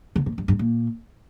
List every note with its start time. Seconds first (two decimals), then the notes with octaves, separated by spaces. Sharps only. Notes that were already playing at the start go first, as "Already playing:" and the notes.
0.16 D3
0.26 A#2
0.38 G2
0.48 G2
0.59 A#2